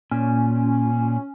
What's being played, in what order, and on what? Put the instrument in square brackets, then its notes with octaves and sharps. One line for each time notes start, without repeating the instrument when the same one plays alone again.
[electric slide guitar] A#2 [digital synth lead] C#4